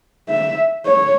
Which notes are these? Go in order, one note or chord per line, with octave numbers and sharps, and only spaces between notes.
E5
C#5